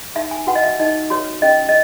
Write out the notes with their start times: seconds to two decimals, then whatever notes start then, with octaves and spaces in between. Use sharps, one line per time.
0.15 D#4 E5
0.31 G#5
0.47 F#4 B4 F#5
0.55 D#5
0.63 E5
0.80 D#4 D#5
1.10 F#4 B4 C#5
1.42 C#4 D#5
1.69 D#5